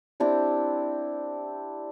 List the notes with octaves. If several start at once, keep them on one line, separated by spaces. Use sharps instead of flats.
C4 D4 E4 G4